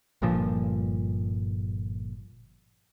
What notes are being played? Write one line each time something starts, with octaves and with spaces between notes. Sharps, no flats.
G1 G2 A#2 F3